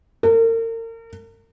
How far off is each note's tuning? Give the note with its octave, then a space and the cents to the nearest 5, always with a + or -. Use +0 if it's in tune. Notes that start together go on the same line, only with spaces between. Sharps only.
A#4 -40